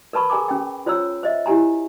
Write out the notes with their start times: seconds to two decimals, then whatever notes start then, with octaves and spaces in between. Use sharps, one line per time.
0.13 A#4 B4 A5 B5 C#6
0.30 G#4 A#4 G#5 A#5 D6
0.48 C#4 G5
0.86 F4 C5 C#5 A#5 E6
1.23 C5 D#5 E5
1.46 E4 G4 G#5 A#5